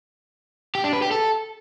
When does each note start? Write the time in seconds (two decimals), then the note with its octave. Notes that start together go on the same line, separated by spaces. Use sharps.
0.75 G4
0.84 D4
0.93 B4
1.02 G4
1.11 A4